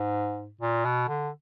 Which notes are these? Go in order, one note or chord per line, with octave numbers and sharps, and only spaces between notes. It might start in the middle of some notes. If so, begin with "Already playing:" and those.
Already playing: G#2
A#2
B2
D3